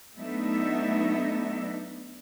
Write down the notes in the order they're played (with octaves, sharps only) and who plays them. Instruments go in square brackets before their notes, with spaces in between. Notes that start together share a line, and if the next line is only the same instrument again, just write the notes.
[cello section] F#3 A3 B3 D4 D#4 E5